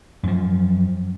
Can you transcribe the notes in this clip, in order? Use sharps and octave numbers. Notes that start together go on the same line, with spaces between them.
F#2 F3